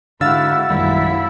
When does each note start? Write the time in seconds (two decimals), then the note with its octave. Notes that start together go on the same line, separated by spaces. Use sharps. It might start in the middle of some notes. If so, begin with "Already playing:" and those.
0.21 G#2 D3 E4 F#4 F5 E6 A6
0.70 A#1 F#2 D#3 G3 E4